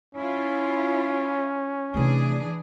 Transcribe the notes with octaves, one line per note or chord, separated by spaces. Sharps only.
C#4 E4 F4
C3 E3 A3 D4 G#4